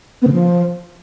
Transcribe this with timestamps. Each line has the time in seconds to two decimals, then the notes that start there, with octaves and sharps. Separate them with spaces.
0.22 B3
0.27 C#3
0.32 F3